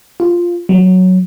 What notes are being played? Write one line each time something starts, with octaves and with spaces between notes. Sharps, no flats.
F4
F#3